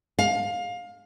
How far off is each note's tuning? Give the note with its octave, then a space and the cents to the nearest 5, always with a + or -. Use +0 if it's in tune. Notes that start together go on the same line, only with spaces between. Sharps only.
F5 +20